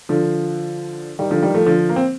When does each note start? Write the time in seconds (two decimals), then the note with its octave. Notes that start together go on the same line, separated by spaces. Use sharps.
0.09 D3 F3
1.19 D#3 G3
1.31 D3 F3
1.42 D#3 G3
1.54 F3 A3
1.66 D3 F3
1.89 A#3
1.96 C4